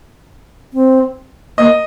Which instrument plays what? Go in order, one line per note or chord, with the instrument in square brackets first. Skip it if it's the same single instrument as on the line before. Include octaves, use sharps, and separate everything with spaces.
[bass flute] C4
[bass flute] A#3 [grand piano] D#5